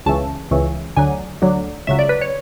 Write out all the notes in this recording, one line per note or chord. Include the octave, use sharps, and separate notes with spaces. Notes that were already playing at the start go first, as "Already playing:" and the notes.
C#2 C#3 E3 A5
C#2 C#3 E3
D2 D3 F#3 G#5
D2 D3 F#3
C#2 C#3 F#3 E5
D5
B4
C#5